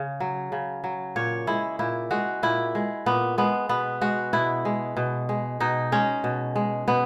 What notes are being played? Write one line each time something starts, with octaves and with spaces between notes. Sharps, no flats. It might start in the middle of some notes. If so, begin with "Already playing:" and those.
Already playing: C#3
F#3
C#3
F#3
A#2 C#5
G#3 E4
A#2 E4
G#3 F#4
A#2 E4
G#3
A#2 B3
G#3 B3
B2 B3
G#3 F#4
B2 E4
G#3
B2
G#3
B2 D#4
G#3 C#4
B2
G#3
B2 B3